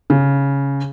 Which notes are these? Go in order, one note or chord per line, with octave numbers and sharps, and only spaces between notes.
C#3